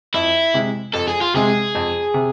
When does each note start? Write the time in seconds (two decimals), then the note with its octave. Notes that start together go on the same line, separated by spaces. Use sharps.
0.14 F2 E4
0.54 C3 G#3
0.94 F2 A4
1.08 G#4
1.22 F4
1.34 C3 G#3 G#4
1.75 F2
2.14 C3